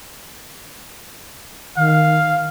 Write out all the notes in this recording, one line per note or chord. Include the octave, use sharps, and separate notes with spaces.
D#3 F5